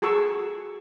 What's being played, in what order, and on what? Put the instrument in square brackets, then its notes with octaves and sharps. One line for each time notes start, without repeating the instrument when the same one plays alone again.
[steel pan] F#4 G#4 A4 C#6 E6